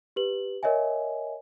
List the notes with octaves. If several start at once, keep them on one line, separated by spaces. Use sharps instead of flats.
G4 B4 F#7
A#4 C#5 D#5 E5 G#5